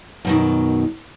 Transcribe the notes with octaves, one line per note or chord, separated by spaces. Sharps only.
F#2 B2 D#3